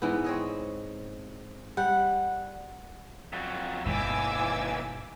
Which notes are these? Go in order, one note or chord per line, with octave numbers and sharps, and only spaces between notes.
G#2 E3 B3
C4 C#5 D#5
G3 F#5
F2 F#3
G1 D#2 B2 E3 G#5 D6 E6